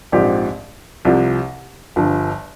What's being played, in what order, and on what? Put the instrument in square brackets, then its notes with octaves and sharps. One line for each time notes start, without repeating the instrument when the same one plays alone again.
[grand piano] A#1 G#2 F3 C4 G4
C2 C3 F3
G1 G2 F3